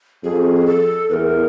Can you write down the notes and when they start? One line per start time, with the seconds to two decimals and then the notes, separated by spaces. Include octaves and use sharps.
0.23 F2 G#4
0.67 A4
1.10 E2 B4
1.14 A#4